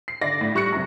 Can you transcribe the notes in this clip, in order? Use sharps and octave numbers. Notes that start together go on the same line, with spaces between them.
C7
D3 D5 A#6
A2
G3 C#6 F#6 A#6 C#7
F#2 C3